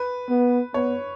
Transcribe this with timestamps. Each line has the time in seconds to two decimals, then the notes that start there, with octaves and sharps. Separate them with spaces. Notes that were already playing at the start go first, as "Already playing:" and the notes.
Already playing: B4
0.29 B3
0.74 B3 C#5